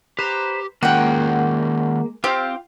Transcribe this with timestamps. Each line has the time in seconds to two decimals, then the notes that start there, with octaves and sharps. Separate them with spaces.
0.19 G4 B4 C5 A#5
0.83 D#3 G#3 A#3 C#4 F4 F#5 G5
2.24 C4 F4 G4 F5